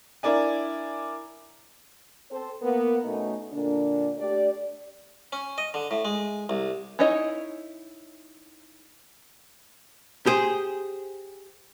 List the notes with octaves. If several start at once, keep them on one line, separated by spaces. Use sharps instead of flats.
D4 E4 A#4 D5 G#5
C4 A4 C5
A#3 B3 A#4
B2 A3 C#4 D#4
A#2 D3 A#3 D4
A3 D4 G4 D5
C#4
D#5
D3
A2
G#3
C2
C#4 D#4 E4 C#5 D#5
G4 G#4 C5